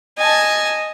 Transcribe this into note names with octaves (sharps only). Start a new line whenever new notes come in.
D#5 G#5 A5